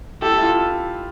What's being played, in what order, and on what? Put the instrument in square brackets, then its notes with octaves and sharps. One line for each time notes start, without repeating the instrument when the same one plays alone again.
[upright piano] E4 G4 [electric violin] A4
[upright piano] E4
F4